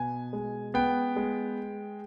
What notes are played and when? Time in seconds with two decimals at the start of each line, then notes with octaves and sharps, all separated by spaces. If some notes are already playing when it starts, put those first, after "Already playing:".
Already playing: B2 B3 G#5
0.33 G#3
0.74 B3 G5
1.16 G#3